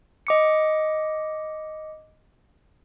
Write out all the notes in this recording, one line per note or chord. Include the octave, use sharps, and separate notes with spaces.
D#5 D6 C#7